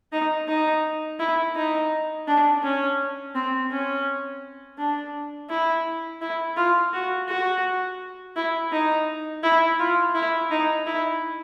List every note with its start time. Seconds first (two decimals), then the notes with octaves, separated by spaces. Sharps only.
0.12 D#4
0.48 D#4
1.19 E4
1.56 D#4
2.27 D4
2.63 C#4
3.35 C4
3.71 C#4
4.78 D4
5.49 E4
6.21 E4
6.57 F4
6.93 F#4
7.28 F#4
8.36 E4
8.72 D#4
9.43 E4
9.79 F4
10.14 E4
10.51 D#4
10.86 E4